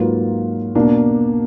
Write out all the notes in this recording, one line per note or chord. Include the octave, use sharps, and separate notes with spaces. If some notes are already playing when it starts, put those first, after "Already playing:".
Already playing: G#2 F#3 A#3 F4 B4
B2 A#3 D4